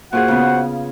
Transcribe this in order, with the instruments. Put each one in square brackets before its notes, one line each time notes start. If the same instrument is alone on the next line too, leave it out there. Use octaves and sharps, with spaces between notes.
[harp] A#2 F4 G#4 [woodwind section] F#4 C5 F#5
[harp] C#3 B3